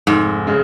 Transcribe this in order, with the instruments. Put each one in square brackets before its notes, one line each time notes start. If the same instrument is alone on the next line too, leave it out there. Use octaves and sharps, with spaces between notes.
[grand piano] F1 [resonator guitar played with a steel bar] G#2
[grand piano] C#3 G#3